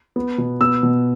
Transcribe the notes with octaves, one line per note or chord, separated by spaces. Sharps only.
B3
B2
B3 E6
B2